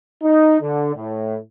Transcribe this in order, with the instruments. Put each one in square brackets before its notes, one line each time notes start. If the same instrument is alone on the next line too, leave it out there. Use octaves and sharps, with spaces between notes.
[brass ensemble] D#4
D3
A2